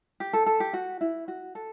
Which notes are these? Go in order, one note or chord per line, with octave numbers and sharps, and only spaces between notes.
G4
A4
A4
G4
F#4
E4
F#4
A4